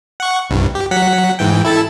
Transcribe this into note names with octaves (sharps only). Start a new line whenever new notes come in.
F#5 C#6
C2 G2
G4
F#3 F#5 B6
G#2 E3 G5
E4 A4 A5